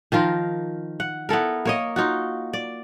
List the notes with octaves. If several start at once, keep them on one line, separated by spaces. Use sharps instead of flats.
D#3 F3 F4 A#4
F#5
B3 E4 A4 A#4
A#3 C#5 D#5
D#4 F4 F#4
D5